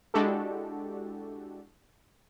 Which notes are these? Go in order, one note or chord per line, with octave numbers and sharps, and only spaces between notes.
G#3 D4 E4 F#4 G4 A4